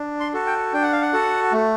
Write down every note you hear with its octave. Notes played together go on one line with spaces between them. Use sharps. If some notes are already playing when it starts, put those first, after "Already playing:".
Already playing: D4
C6
F#4 A4
G5
D4 G5
F#5
F5
F#5
F#4 A4
A3